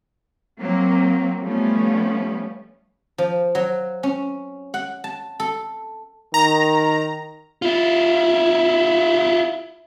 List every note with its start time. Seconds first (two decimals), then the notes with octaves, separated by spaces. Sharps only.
0.60 F#3 A#3 C4
1.42 F3 G3 A3 B3 C#4
3.18 F3
3.55 F#3
4.03 C#4
4.74 F#5
5.04 A5
5.40 A4
6.34 D#3 A#5
7.62 E4 F4